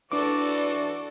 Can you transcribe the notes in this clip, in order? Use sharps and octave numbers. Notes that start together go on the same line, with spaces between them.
E3 D4 F#4 A4 D5 D6